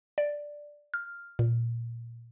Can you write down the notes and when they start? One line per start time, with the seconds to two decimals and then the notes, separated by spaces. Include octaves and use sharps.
0.18 D5
0.94 F6
1.39 A#2